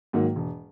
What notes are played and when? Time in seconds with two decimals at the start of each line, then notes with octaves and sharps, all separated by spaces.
0.13 G#2 D#3 F#3 A#3
0.36 E1